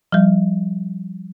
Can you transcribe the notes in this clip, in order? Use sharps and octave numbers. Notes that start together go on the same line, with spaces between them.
F3 G3